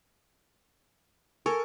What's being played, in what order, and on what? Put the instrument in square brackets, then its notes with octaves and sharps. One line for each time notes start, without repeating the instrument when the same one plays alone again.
[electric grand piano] A4 G#5 C#6 [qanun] A#4